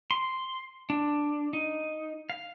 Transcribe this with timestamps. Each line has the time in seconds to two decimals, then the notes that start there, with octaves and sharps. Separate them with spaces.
0.11 C6
0.90 D4
1.53 D#4
2.30 F5